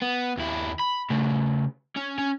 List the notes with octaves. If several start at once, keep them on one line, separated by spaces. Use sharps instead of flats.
B3
D#2 E4
B5
C#3 A3
C#4
C#4